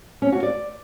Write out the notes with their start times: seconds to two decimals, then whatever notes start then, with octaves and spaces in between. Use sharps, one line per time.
0.22 C#4
0.32 F#4
0.43 D5